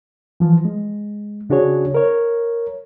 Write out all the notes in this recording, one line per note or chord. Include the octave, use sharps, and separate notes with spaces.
E3 F3
G#3
C#3 D4 F#4 G#4 C#5
A#4 C#5